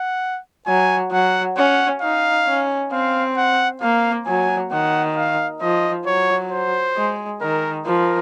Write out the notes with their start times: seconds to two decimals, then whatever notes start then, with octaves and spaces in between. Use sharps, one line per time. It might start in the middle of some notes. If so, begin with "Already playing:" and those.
Already playing: F#5
0.67 F#3 G#5
1.11 F#3 F#5
1.57 C#4 F#5
2.02 D#4 F5
2.47 C#4
2.92 C4 F5
3.37 F#5
3.82 A#3 F5
4.27 F#3 G#5
4.72 D#3 F#5
5.17 F5
5.61 F3 D#5
6.07 F#3 C#5
6.52 C5
6.96 G#3
7.41 D#3 A#4
7.86 F3 A#4